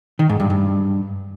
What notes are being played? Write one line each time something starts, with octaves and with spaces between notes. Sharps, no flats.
D#3
G#2
G2
G2